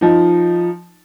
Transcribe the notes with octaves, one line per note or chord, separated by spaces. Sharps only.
F3 D#4